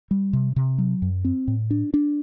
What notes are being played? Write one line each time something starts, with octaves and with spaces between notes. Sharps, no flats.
G3
C3
C3
F#3
F#2
C4
A2
D4
D4